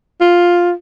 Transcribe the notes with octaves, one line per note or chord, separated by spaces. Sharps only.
F4